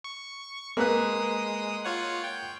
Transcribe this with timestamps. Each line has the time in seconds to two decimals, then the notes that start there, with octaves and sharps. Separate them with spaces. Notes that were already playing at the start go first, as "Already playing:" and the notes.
0.04 C#6
0.77 G#3 A#3 B4 D#6 F#6
1.85 F4 C#5 F#5
2.24 G5